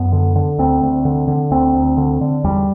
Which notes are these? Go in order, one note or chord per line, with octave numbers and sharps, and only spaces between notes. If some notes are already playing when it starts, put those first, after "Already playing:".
Already playing: F#2 B3
D3
D3
D2 C4
D2
D3
D3
D2 C4
D2
D3
D3
E2 G3